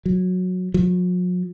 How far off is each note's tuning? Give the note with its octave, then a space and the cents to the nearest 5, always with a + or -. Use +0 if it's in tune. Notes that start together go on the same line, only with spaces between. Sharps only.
F#3 -15
F#3 -45